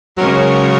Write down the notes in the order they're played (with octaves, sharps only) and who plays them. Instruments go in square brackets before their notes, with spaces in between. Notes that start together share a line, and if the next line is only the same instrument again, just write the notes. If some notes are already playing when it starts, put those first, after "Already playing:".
[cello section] C#3 G#3 C#4 A#4 C#5 [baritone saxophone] F#3